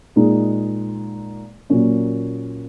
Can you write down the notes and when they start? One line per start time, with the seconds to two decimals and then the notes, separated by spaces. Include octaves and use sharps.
0.16 A#2 G#3 D#4
1.70 A#2 F#3 A#3 C#4